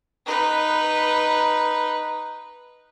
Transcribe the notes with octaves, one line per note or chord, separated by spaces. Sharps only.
D#4 B4